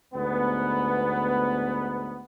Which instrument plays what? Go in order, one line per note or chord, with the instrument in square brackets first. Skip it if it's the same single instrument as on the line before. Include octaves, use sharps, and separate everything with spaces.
[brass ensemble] D2 G#2 B3